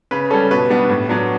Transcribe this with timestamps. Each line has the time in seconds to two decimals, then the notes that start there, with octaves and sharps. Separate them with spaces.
0.11 C#3 B4
0.30 G3 C#4 A4
0.51 B2 B4
0.69 G3 B3 D4
0.89 A2
1.09 F#3 B3 D4